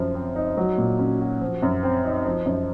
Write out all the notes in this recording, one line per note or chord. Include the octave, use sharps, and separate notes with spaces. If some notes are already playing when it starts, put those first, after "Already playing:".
Already playing: F#2 F3
C4
D#4
F#3
A#2
C#4
F#4
F3
F#2
C4
D#4
F3
F#2